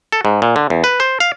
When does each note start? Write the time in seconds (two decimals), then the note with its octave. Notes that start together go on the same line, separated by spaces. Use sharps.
0.12 A4
0.25 G#2
0.42 A#2
0.56 D3
0.70 E2
0.84 B4
1.00 C5
1.20 F5